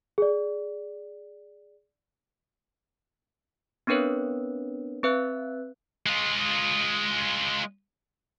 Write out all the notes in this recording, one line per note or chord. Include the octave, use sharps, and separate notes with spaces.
G#4 D5
B3 C4 D4 A#4 B4 C#5
C4 B4 E5 F#6
G#3 F4